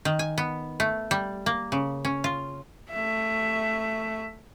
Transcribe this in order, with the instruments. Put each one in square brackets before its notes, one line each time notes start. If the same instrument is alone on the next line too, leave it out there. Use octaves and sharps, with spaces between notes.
[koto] D#3
G#5
B3
A3
G3
A#3
C#3
C#4
F4
[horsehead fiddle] A3 E5